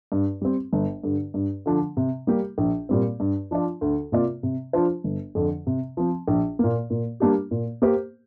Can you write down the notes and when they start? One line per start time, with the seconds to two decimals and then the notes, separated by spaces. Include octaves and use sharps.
0.12 G2
0.42 G3 C4
0.73 G1
1.03 G2 D3
1.34 G2
1.66 D3 F3 D4
1.97 C3
2.27 G3 A#3 G4
2.58 A#1
2.89 A#2 G3 C4
3.20 G2
3.51 F3 D4 F4 D5
3.81 D2
4.12 C3 A#3 F4 D5
4.43 C3
4.73 F3 D4 F4 C5
5.04 G1
5.35 F2 D3
5.67 C3
5.97 F3 C4
6.28 A#1
6.59 A#2 A#3
6.90 A#2
7.20 G3 A#3 D4 G4
7.51 A#2
7.82 A#3 G4 C5